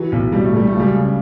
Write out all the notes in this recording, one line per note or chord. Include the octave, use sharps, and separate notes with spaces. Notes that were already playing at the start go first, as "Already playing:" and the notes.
Already playing: E3 F#3
B1
B1 G3
A3
B1 G3
A3
C#2
G3
C#3